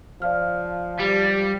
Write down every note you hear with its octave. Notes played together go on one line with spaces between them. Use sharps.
F3 D5 F5 F6
G3